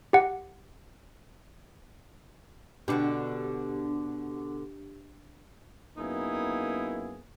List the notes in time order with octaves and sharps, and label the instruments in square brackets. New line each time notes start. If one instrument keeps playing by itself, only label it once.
[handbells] G4 F#5
[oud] B2 D3 F#4 [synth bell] D4 G4
[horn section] F#2 A#3 B3 D#4 E4 G#4